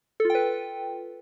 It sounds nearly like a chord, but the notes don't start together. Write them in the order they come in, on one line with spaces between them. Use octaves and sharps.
A4 F4 G5 B4